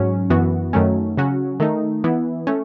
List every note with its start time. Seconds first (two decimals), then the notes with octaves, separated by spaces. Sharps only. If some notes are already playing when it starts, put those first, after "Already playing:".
Already playing: G#2 F#3 C#4
0.30 F#2 E3 B3 F#4
0.73 F#2 D#3 F#3 A3 C#4
1.17 C#3 F#3 C#4 F#4
1.60 D#3 A3 D#4
2.04 E3 B3 E4
2.47 A3 C#4